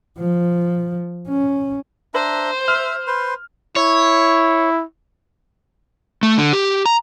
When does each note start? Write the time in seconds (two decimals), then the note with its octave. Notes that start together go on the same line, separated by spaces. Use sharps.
0.19 F3
1.28 C#4
2.14 D4 C5 E5 A#5
2.68 E5 F6
3.07 B4 C5 C6
3.76 E4 C#5
6.23 A3
6.38 D3
6.53 G4
6.86 A#5